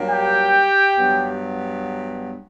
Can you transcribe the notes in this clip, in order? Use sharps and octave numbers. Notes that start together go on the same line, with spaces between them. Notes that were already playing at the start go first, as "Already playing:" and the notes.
Already playing: G2 F#3 A#3
G4 G5
G2 F#3 B3